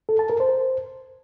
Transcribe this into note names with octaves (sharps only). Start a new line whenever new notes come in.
A4
A5
A#4
C5